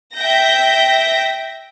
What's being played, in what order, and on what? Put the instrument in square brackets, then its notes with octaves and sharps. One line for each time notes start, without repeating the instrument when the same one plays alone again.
[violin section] E5 G5 G6 A#6